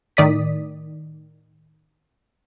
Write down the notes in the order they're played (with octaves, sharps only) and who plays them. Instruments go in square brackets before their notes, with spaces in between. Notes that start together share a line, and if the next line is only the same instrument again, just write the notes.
[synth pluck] A2 D#3 D5 D#6 B6